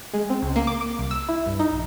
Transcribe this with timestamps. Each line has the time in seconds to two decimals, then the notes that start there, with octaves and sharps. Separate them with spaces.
0.14 G#3
0.30 C4
0.42 C#2
0.56 A#3
0.67 D6
0.81 D6
0.99 C2
1.11 E6
1.29 E4
1.46 G2
1.59 D#4
1.71 A#1